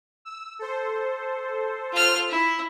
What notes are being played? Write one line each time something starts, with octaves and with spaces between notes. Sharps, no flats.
E6
A4 C5
F4 F6
E4